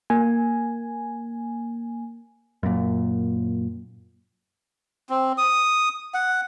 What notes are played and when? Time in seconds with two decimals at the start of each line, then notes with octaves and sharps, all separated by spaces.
0.10 A#3 G#5
2.63 F#2 A#2
5.10 C4
5.38 D#6
6.14 F#5